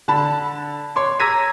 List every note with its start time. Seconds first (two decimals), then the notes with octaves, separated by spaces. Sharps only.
0.08 D3 A5 B5
0.96 C#5 C6 D6
1.20 A#5 E6 G#6 A#6 B6 D#7